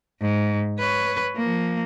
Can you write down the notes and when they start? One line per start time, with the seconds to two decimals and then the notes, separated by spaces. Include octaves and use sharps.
0.21 G#2
0.79 B4 C#5
1.36 F3 A#3